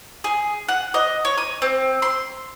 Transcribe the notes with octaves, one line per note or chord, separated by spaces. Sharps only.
G#4
F#5
D#5
C#5
D#6
C4
C6